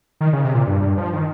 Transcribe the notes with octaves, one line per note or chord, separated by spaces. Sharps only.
D#3
C#3
C3
A#2
G2
G2
F3
D#3